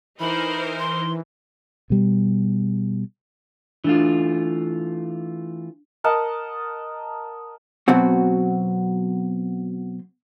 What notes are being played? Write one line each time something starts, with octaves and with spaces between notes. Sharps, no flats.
E3 D#4 A#4 C5 B5
C6
B2 G3
E3 A3 D4 F4
A#4 D#5 F#5 A5
B2 F#3 C4 F#4